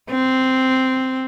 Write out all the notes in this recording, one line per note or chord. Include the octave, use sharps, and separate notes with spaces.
C4